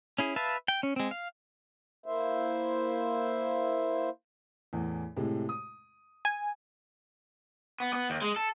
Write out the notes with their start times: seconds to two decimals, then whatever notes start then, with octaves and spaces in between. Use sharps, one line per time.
0.18 C#4 E4 G#4
0.36 B4 E5 F5 A5
0.68 G5
0.83 C#4
0.96 G#3 C4
1.11 F5
2.06 A#3 E4 C5 E5
4.73 E2 A2 E3
5.16 A2 C3 G#3
5.49 D#6
6.25 G#5
7.80 B3
7.93 B3
8.10 D#2
8.22 G#3
8.36 A4